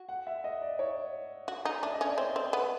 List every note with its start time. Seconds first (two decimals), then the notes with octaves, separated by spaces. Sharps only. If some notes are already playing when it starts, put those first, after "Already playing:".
Already playing: F#4
0.09 F#5
0.27 E5
0.44 D#5
0.62 D5
0.79 C#5
1.48 F#4
1.65 D#4
1.82 D4 E5
1.94 D#5
2.01 C#4
2.07 D5
2.18 C4 C#5
2.36 C4
2.53 B3